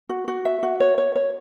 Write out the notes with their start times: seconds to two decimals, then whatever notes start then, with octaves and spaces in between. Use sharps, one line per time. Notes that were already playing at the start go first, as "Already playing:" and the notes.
0.09 F#4
0.28 F#4
0.45 E5
0.63 F#4
0.80 C#5
0.98 C#5
1.15 C#5